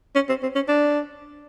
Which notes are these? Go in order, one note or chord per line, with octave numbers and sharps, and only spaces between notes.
C#4
C4
C4
C#4
D4